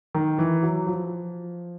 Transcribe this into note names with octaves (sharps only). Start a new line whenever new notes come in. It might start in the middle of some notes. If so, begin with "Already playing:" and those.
D#3
E3
F#3
F3